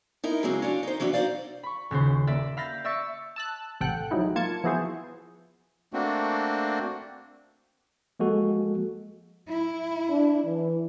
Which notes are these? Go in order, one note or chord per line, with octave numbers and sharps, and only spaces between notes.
D#4 E4 A#4
C#3 F#3 G#3 A#3 C4 D#4
C#4 D4 F4
D#4 C5
E3 F#3 C#4 D4
D#4 C5 D5 F5
B5 C#6
D#1 C#3 F#4 C5
A#3 D5 E5
E5 F5 B5 G6 A6 A#6
D5 E5 C#6 E6 A6 C#7
A5 E6 F#6
A1 C3 A4 F#5 G5 F#6
F3 F#3 G#3 D#4 E4
A#3 F4 A5 G#6 C#7
F3 B3 E4 F#4 G#4 C5
A3 A#3 C4 D4 F#4
F3 G#3 A#3 F#4 A4
E4
D4
E3